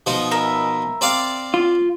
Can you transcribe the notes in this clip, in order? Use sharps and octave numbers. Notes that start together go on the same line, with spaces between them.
B2 F3 D#4
A#4 E5 B5
C4 D5 F5
F4